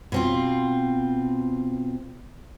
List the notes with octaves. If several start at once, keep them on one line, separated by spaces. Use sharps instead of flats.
B2 C4 F4